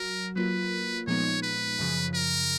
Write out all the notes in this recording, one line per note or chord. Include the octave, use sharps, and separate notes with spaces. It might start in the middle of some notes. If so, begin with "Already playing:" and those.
Already playing: F#3 F#4 A#4
F#3 A#3 F4 A#4 B4
A#2 F3 G#3 B3 D#4 C#5
B4
F#2 C#3 F3
A#4